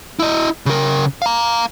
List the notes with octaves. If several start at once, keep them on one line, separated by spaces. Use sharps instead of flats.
E4 D#5
C#3 A#4
F5 A#5